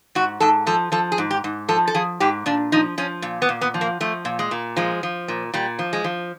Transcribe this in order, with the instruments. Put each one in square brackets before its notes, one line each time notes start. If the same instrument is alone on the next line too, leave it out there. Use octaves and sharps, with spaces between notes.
[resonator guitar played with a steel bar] G#2 F#4
G#2 A4
F3 A4
F3 A4
G#4
G#2
G4
G#2
F3 A4
A4
F3 G#4
G#2 G4
A#2 D4
F3 D#4
F3 C#4
A#2
B3
A#2
B3
F3
A#3
F3 A3
A#2
G#3
A#2
F3 G#3
F3
A#2
A#2 G3
F3
G#3
F3